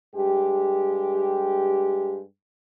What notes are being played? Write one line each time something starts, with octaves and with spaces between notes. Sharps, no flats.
G2 G#3 G4